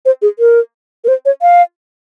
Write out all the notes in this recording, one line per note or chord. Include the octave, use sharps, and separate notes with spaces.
C5
G#4
A#4
A#4
C5
C#5
F5